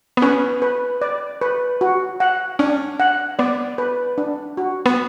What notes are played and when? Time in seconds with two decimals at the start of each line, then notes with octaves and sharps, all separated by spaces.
0.17 B3
0.22 C#4 B4
0.62 B4
1.02 D5
1.41 B4
1.81 F#4
2.20 F#5
2.59 C#4 D4
3.00 F#5
3.39 B3 D5
3.78 B4
4.18 D4
4.57 F#4
4.86 B3